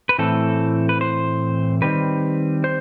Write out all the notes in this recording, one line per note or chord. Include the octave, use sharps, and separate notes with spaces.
B4
A2 E3 A3 C4 A4
B4
C5
D#3 G3 C4 B4
C5